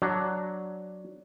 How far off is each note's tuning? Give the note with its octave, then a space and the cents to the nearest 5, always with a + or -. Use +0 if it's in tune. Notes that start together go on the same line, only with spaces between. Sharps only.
F#3 +5 D4 +0